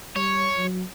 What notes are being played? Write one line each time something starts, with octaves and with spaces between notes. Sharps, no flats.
G3 C#5
F#3